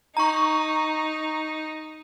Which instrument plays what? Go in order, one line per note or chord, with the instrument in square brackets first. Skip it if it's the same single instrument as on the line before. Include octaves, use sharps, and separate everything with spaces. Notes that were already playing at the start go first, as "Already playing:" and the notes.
[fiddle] D#4 [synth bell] A#5 C#6